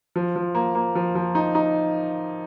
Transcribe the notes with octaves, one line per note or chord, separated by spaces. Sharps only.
F3
F3
A#3
A#3
F3
F3
D#4
D#4